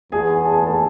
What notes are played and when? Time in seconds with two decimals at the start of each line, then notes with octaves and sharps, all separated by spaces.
0.12 E2 G#4 G#5
0.45 A5
0.56 G#5
0.67 A4 A5